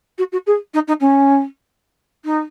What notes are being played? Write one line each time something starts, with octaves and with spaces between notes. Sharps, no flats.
F#4
F#4
G#4
D#4
D#4
C#4
D#4